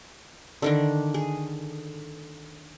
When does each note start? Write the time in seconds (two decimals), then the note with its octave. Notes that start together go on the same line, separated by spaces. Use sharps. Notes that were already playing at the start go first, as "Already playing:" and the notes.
0.62 D3 D#3 D4
1.14 G#4